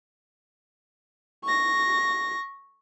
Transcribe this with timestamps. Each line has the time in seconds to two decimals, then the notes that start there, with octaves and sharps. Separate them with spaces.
1.44 C#6 A#6